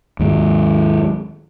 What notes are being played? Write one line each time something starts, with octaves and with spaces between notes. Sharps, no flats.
D#2 G#2